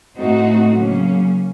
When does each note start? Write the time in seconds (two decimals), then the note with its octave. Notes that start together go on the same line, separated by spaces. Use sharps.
0.18 A2 A3 C4 D#4 F#4
0.75 C#3 F#3 A#3 C#4